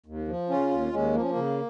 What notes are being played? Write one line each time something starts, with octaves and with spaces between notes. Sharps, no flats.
D#2
F3
C#3 C#4 F4
D#2
D#2 G#3 C#4
F3 A#3
C#4
A#3
C#3